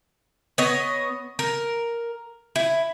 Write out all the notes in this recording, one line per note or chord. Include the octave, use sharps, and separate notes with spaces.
B3 C#5 D#5
A#4
E4